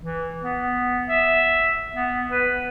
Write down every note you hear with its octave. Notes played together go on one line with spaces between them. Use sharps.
E3
B3
E5
B3
B4